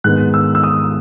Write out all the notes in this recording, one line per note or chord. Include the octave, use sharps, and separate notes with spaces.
G#2 D#3 G#3 B3 F#6
E6
E6
D#6